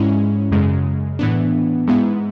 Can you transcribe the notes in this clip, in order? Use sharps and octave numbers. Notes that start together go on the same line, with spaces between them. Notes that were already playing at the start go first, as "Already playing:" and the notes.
Already playing: G#2 G#3 C#4 E4
F#2 C#3 G#3
A2 E3 B3 D4
G#2 G#3 B3 E4